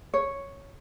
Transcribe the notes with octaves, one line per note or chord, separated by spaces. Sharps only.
C#5